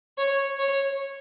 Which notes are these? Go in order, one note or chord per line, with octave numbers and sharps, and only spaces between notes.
C#5
C#5